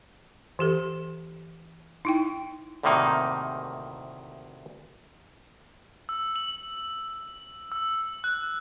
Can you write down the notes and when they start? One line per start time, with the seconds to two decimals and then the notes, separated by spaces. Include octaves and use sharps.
0.59 E3 G4 A4
2.05 D#4 E4 G5
2.83 D2 A2 C3 D#3 A#3 D#4
6.09 E6
6.36 F#7
7.72 E6
8.24 F#6